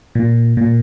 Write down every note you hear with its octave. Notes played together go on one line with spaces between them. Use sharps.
A#2
A#2